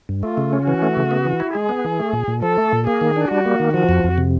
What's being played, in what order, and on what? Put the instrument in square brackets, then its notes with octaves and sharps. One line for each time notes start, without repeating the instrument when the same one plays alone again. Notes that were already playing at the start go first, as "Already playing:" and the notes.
[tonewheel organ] G2
[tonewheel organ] A3 [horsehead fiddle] F4
[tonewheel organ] C#3
C#4
[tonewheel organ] E3 [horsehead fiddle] F#4
[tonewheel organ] A3
C#3
B3
E3
E4
[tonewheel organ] G#3 [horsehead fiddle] G#4
[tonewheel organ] B3
E3
A3
A#2
A#2
[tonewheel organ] F3 [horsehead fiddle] A4
[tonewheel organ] A3
A#2
[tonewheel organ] A#3 [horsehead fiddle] G#4
[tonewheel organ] D#3
D4
[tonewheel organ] G3 [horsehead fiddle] F#4
[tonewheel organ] A#3
D#3
[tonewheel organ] F3 [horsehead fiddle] F#4
[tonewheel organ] F2
F2
C3